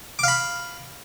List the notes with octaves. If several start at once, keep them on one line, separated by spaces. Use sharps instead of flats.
F5 B5 D6